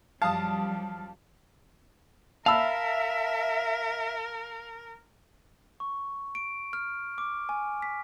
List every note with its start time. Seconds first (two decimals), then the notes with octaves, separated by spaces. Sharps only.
0.22 F#2 F3 G3 F5 A5 D#6
2.46 A#4 E5 F5 A5 B5 E6
5.80 C#6
6.35 D7
6.73 F6
7.18 D6
7.49 G#5
7.82 B6